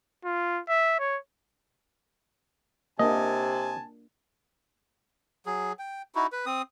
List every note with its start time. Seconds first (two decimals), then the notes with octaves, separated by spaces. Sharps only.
0.25 F4
0.68 E5
0.99 C#5
2.99 C3 A#3 D4 D#5 G#5 A5
5.46 F#3 G#4
5.79 G5
6.15 D#4 E4 F#4
6.32 B4
6.46 C4 D#6